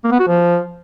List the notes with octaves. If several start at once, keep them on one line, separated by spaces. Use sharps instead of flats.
A#3
B3
F#4
F3